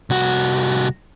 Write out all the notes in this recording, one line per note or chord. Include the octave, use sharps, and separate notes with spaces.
C2 F#4